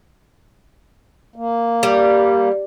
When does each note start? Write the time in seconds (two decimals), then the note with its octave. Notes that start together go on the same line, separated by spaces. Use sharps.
1.36 A#3
1.83 G3